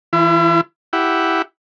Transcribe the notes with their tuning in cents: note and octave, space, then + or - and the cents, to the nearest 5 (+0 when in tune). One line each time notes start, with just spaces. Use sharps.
E3 +0 E4 +45
E4 +0 G4 +0 F#5 +0